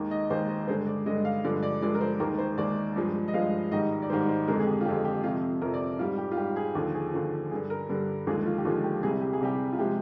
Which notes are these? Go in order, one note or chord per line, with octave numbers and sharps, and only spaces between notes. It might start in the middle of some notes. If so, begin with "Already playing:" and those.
Already playing: D#2 D#3 G#3
D#5
D#2 D#3 G#3 C5
D#5
G2 D3 G#3 C5
D5
G2 D3 G#3 D#5
F5
G2 D3 F3 G#3 D5
D5
G2 D3 F3 G#3 D5
A#4
C5
D#2 D#3 G#3 A#4
C5
D#2 D#3 G#3 D5
G2 F3 G#3
D#5
G2 F3 G#3 F5
G#2 D#3 G3 D#5
D5
G#2 D#3 G3 C5
C5
F2 D3 G#3 A#4
G#4
G4
F4
F2 D3 G#3 G4
G4
F2 C3 F3 F4
F2 C3 F3 A#4
D5
G#2 G3 F4
G4
F4
G#2 G3 G4
G#4
D#2 D3 F3 F4
G#4
D#2 D3 F3
G2 D3 G3 G#4
A#4
G2 D3 G3
D#2 D3 F3 G#3 G#4
F4
G4
D#2 D3 F3 G#3 F4
G4
C2 C3 G3 G#4
G4
G#4
C2 C3 G3 G4
F4
C3 F3 G#3 G4